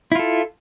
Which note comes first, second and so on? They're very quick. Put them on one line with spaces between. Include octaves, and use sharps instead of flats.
E4 F4 A4